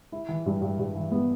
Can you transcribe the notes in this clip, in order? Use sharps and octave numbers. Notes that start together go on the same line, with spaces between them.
E4
E3
G2
G2
G2
E3
B3